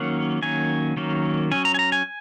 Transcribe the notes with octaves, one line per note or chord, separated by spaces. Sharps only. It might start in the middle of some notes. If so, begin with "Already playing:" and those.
Already playing: D#3 F#3 A#3 C#4 F#5
D#3 F#3 A#3 C#4 G#5
D#3 F#3 A#3 C#4
F#3 C#4 G#5
A#5
G#5
A#5
G#5